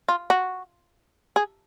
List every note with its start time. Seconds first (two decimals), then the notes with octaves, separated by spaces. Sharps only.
0.09 F4
0.30 F#4
1.36 G#4